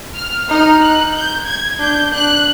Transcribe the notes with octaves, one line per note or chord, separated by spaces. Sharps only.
F6
D#4 F6
F#6
G6
G#6
D4 G6
D4 F#6